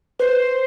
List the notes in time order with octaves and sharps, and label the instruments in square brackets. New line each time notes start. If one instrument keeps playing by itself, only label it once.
[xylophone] B4 [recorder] C5